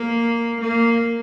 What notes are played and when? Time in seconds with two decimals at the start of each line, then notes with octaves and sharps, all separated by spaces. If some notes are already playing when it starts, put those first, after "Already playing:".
Already playing: A#3
0.61 A#3